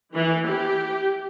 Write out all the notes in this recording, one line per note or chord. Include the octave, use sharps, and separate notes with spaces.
E3
G4